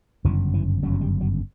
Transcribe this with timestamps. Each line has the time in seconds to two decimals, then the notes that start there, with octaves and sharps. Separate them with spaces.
0.24 G1 F#2 C#3 E3
0.54 E3
0.83 G1 F#2 C#3 F#3
0.94 F#3
1.01 G3
1.21 F#3